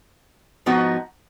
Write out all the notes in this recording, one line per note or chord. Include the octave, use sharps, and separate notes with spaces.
G#2 F3 B3 D#4 F#4